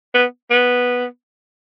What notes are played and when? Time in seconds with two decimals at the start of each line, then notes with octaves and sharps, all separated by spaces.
0.14 B3
0.50 B3